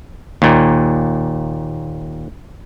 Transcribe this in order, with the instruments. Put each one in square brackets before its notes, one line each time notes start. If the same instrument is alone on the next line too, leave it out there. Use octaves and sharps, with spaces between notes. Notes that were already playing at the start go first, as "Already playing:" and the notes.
[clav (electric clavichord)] D#2 A#2